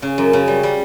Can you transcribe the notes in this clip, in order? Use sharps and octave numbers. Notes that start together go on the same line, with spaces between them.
C#3
F#2
C#3
G3
G3